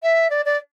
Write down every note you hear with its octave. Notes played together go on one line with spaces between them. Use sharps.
E5
D5
D5